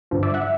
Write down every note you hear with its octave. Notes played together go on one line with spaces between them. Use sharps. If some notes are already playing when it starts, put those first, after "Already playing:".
G2 D3 F3
D5 E5
E5 F#5